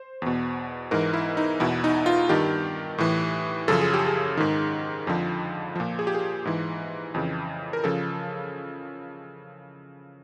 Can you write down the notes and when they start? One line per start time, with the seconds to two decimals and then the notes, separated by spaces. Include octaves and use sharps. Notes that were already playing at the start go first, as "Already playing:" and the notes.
Already playing: C5
0.22 E2 B2
0.91 G#2 E3 A#4
1.14 E4
1.37 D#4
1.60 E2 B2 E4
1.84 D#4
2.06 F4
2.29 G2 D#3 G4
2.98 A2 E3
3.68 F#2 C#3 F3 A4
3.81 G#4
3.93 G4
4.06 G#4
4.37 G#2 D#3
5.07 F2 D3 F3
5.76 A#2 F3
5.99 G#4
6.07 G4
6.15 G#4
6.45 G#2 E3
7.14 F2 C#3 E3
7.73 A#4
7.84 C#3 F3 A4